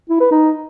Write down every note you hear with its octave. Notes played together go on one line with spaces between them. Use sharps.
E4
B4
D#4